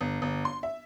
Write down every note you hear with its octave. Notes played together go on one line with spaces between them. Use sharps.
G1
G1
C6
E5